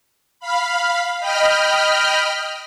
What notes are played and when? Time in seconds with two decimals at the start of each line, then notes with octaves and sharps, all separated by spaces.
0.40 F5 B5
1.20 D#5 G5 B5 F6